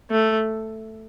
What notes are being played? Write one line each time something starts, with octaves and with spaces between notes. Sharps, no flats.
A3